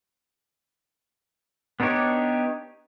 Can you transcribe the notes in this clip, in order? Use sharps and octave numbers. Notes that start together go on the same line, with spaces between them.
B3 D4 D#4 G4 C#5